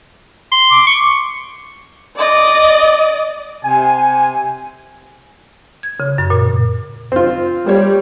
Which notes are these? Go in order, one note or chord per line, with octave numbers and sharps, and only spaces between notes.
C6
D6
C#6
D5 D#5
C3 G#5
G#6
C#3
F#2
A#2
C4 F4
G3 C5 C#5